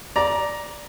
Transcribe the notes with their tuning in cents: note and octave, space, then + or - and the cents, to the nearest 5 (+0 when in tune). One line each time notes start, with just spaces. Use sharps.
D5 +0 A#5 +10